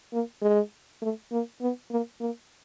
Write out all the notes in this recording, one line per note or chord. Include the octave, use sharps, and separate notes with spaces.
A#3
G#3
A3
A#3
B3
A#3
A#3